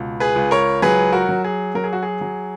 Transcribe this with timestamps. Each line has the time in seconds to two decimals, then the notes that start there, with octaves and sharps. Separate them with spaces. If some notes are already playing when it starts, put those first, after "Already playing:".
Already playing: C#2 B2
0.20 G#4 B4
0.36 C#2
0.51 A#4 C#5
0.82 F#3 G#4 B4
1.12 F#4 A#4
1.29 F#3
1.44 G#4
1.75 F#3 A#4
1.84 G#4
1.93 F#4
2.03 G#4
2.21 F#3